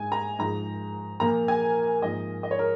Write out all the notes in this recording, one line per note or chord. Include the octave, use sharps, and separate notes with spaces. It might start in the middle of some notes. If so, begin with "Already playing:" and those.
Already playing: G#2 G#3 G#5
A#5
G#2 F3 G#3 A#5
A#2 F3 A#3 A#5
G#5
G#2 F3 A#3 D#5
D#5
C#5
A#4